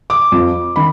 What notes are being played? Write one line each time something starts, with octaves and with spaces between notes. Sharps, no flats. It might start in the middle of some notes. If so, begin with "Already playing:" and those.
D6
F2 F3
D#3 B5